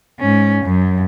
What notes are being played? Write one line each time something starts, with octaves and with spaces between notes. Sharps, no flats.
G#2 C#4
F#2